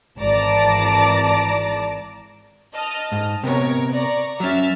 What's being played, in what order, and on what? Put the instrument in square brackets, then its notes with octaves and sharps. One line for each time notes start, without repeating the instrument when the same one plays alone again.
[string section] G#1 E3 D5 A5 A#5 D6
[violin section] D#5 A5 F6
[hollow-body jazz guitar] G#2
[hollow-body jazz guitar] C3 B3 [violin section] A#4 C#5
[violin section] D5 A#5 C#6
[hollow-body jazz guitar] F#3 C#4 [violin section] E5 F6 A6